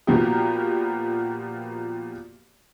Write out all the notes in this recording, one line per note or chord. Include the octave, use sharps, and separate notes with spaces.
A#2 F3 A#3 B3 F#4 G4